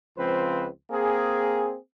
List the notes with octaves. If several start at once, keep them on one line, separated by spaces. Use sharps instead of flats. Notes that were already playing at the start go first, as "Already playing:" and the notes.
C#2 F3 C4 B4 C5
A#3 C4 G#4